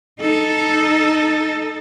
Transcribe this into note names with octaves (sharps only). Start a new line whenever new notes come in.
D#4 A4